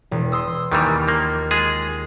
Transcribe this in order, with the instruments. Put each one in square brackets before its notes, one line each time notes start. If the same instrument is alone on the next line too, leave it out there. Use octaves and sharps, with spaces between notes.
[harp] E1
C6 D#6 E6
[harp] D#2 [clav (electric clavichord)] D#3 E3 G3
[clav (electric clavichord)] F3 A#3
G#3 F4 G#4